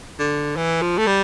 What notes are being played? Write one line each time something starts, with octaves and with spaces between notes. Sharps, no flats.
D3
E3
F3
A3
G3